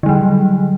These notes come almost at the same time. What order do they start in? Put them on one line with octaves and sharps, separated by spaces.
D3 G3 F#3